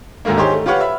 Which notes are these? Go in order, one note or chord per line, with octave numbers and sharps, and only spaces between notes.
D2 G#2 D#3 A3 A#3
D#4 G4 G#4 C5 C#5 C6
A3
F4 G4 B4 C#5 F#5 F6
E5 B5